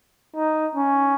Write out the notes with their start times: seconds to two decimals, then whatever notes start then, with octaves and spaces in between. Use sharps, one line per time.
0.35 D#4
0.75 C#4